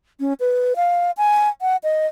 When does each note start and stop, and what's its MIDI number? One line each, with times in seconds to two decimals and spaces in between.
0.20 0.33 61
0.40 0.73 71
0.76 1.11 77
1.17 1.48 80
1.62 1.77 78
1.84 2.07 75